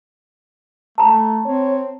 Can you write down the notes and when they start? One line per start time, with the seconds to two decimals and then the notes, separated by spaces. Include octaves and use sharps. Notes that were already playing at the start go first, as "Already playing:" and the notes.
0.98 A3 A5 A#5
1.46 C4 C#5